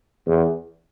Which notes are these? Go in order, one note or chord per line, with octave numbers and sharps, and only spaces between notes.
E2